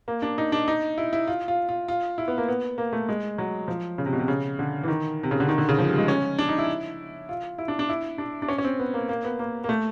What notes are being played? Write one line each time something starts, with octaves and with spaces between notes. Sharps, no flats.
A#3
D4
D#4
D4
D#4
E4
E4
F4
F4
F4
F4
E4
B3
A#3
B3
A#3
A3
G#3
F#3
F3
C#3
C3
B2
C3
C#3
D3
E3
D#3
C3
C#3
D3
D#3
D3
C#3
F3
G3
G#3
C#4
D4
D#4
E4
F4
E4
D4
D4
E4
D4
D4
C#4
C#4
C4
B3
A#3
A#3
B3
A#3
A#3
A3